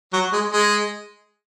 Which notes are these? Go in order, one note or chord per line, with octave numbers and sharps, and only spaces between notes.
F#3
G#3
G#3